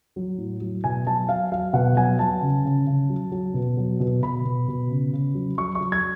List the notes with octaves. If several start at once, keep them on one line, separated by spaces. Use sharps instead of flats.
F#3
A2
F#3
B2 G#5
F#3 A5
F#3 F5
F#3 F5
B2 F#5
F#3 G#5
F#3 A5
C#3
C#3
C#3
F#3
F#3
B2
F#3
B2
B2 B5
B2
B2
C#3
C#3
F#3
F#3 C#6
C#6
F#3
G#6